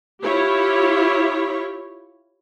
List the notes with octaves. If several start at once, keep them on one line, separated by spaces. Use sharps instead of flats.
E4 F4 G4 C#5